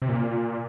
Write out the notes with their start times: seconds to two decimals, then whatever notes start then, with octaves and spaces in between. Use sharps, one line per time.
0.02 C3
0.08 A#2